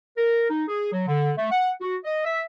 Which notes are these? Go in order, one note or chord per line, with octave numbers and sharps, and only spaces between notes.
A#4
D#4
G#4
F#3
D3
A3
F#5
F#4
D#5
E5